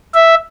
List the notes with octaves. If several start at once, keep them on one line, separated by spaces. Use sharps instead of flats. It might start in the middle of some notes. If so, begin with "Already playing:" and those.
E5